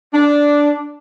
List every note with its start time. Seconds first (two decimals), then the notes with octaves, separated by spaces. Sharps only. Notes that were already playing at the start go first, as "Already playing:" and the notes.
0.14 D4